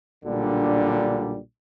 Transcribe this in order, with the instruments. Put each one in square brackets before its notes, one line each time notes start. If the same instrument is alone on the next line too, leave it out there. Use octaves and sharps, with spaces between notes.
[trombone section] B1 A#2 D3 G3 D4